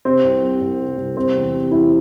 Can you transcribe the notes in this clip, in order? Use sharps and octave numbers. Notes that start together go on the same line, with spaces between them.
C3 C4
C2
G3
C2
C3
C2
C3 C4
E2
G3
E2 E4